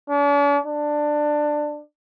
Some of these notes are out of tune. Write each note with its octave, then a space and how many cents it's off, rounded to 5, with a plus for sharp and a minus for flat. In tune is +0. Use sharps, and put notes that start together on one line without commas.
D4 -45
D4 +15